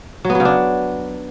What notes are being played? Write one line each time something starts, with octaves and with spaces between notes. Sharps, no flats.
F#3
B3
F#3
C#3
D4